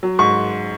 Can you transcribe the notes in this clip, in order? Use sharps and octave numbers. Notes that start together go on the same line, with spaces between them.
F#3
G#2 C#6